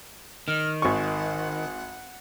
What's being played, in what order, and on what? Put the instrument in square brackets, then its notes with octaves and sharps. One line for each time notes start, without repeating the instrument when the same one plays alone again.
[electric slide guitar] D#3 [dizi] F6
[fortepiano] G#1 C#6 [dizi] F#5